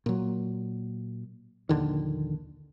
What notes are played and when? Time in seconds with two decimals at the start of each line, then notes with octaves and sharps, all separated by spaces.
0.06 A#2 F#3
1.69 A#1 D#2 D3 D#3